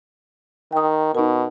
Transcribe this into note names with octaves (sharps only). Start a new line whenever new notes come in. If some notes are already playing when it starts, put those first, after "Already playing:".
D#3 G5 D#6
B2 D#4 A#4